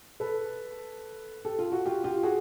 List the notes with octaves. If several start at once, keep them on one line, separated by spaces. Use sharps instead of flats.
A4 B4
G4 A4
F4
F#4
F4 G4
F4 G4
F#4 G#4